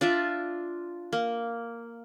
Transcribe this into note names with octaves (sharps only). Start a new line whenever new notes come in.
D4 F4 D5 E5
A#3